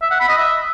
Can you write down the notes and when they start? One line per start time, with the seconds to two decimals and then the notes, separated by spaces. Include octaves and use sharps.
0.02 E5
0.11 F#5
0.20 B5
0.29 D#5
0.38 E5